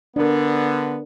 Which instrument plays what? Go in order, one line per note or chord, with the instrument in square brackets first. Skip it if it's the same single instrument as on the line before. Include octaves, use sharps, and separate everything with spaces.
[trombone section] D3 B3 [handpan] D4 A#4